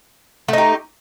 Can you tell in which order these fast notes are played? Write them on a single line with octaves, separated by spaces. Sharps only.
A3 D#4 G4